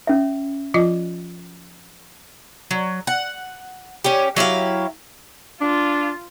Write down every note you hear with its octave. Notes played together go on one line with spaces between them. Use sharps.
C#4 E5
F3 F4 D#5
F#3
F#5
C#4 G4
F#3 E4 G4 F5
D4 F4